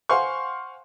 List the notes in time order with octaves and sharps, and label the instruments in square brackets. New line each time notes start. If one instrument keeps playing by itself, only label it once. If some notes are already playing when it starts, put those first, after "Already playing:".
[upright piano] C5 F5 F#5 G#5 C6 C#6